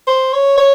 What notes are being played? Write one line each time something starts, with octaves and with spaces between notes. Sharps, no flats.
C5
C#5
C#5